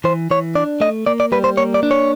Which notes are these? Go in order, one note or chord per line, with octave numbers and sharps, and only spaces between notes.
E3 C5
E3 C#5
D4 D5
A3 D#5
A#3 D5
D5
G3 B4
C5
A#3 C#5
D5
D4
C#5